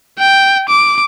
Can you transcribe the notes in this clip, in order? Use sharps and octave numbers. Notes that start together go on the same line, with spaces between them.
G5
D6